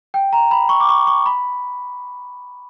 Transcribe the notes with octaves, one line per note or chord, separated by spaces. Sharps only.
G5
A#5
B5
C#6
D6
C#6
C#6
B5